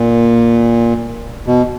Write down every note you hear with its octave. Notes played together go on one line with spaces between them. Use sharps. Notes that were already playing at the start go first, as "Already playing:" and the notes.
Already playing: A#2
B2